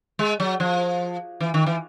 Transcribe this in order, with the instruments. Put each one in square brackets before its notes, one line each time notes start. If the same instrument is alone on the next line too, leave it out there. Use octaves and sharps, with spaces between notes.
[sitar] G#3
F#3
F3
E3
D#3
E3